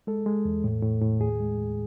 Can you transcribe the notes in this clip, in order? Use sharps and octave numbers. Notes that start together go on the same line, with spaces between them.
G#3 A4
G#3
E2
A2
A2
A2
D#2 G#4
G#3
D#2